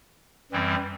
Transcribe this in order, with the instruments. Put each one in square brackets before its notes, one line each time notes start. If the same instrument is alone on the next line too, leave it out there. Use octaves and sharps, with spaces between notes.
[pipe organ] F#2 E3 G3 C4